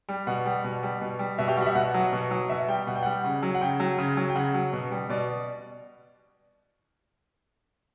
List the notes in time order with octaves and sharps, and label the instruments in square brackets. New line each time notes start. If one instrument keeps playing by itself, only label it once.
[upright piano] G3
B2 F#5
G3
B2
G3
B2
G3
B2 E5
G4
G3 F#4
F#5
E5
B2 F#5
F#3
B2
F#3
B2 E5
G3 G5
B2 F#5
G5
G3 F#5
C#3
F#3
F#5
C#3 G5
F#3
C#3
F#3
G5
C#3 F#5
F#3
B2
G3
B2 D5